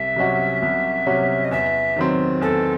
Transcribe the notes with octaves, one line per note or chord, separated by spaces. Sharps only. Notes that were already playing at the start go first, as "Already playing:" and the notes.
Already playing: C2 E5
C3 F#3 C#4 F#4
C2
C3 F#3 C#4 F#4
D#5
E2 E5
D#3 F#3 C4
E2 A4